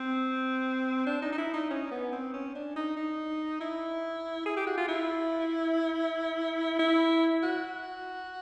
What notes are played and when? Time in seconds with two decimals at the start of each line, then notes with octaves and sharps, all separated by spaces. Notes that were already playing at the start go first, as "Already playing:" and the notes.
Already playing: C4
1.06 D4
1.22 D#4
1.32 D#4
1.38 E4
1.54 D#4
1.70 C#4
1.91 B3
2.12 C4
2.34 C#4
2.55 D4
2.76 D#4
2.97 D#4
3.61 E4
4.46 G#4
4.57 G4
4.67 F#4
4.78 F4
4.88 E4
6.79 E4
7.43 F#4